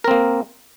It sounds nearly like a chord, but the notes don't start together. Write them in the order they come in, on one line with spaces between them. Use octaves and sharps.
A#4 C4 A#3